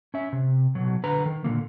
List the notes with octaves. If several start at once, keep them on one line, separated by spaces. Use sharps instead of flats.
C#4 E5
C3
B2 F#3
D3 B4 A#5
D#3
A#2 D3 F3 A#3